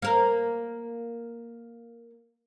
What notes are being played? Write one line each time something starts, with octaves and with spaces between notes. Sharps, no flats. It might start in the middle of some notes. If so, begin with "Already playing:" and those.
A#3 A#4